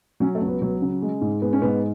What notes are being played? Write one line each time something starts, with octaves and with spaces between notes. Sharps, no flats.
F#3 C#4
A3
C#2
B3
F#3
C#3
G#3
G#2
G#3 B3
C#4
G#2 B3